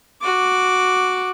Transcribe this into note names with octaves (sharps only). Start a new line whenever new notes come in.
F#4 D6